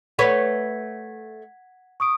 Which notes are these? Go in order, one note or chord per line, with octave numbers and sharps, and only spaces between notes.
A3 B4 C#5 F#5 G#6 B6
C#6 D#6 D7